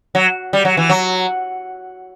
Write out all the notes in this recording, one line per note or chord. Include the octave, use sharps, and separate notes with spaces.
F#3
G3
F#3
E3
F#3